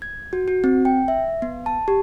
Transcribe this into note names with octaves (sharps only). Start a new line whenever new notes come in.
G#6
F#4
F#4
C4
G5
E5
B3
A5
G4